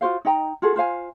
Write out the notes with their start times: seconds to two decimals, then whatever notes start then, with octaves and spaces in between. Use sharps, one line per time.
0.01 F4 F#4 C5 F5
0.25 D#4 D#5 G5 A#5
0.62 F4 F#4 G#4 A4
0.76 F4 C5 F5 G#5